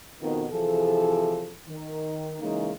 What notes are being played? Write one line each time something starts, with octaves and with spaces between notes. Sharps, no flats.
F2 B2 D#3
C3 E3 F3 G#4 A4
D#3
C#3 E3 G#3 A#3 D#4